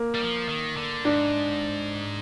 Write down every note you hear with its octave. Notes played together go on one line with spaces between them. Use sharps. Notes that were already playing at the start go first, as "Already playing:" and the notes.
Already playing: A#3
G3
F3
D#3
D3
G#2 D4